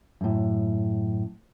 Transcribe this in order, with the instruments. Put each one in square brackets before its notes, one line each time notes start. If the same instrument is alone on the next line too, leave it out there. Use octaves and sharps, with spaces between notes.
[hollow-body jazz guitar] F#2 A2